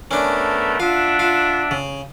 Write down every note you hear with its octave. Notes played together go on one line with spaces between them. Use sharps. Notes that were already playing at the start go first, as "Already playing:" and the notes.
A3 B3 C#4 D4 A#4
D4 F4 E5 F#5
F4
C#3